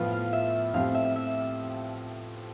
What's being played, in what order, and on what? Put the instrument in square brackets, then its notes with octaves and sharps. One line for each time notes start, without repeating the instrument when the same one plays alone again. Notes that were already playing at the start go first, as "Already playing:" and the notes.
Already playing: [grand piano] A2 F3 B3 F4
[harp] F5
E5
[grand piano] A2 F3 C4 G4 [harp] F5
[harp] E5
E5